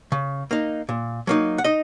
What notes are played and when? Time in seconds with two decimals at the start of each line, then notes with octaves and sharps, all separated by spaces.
0.12 C#3
0.51 A#3 D#4
0.89 A#2
1.27 F#3 A#3 D#4
1.58 F#5
1.64 D#4 D#5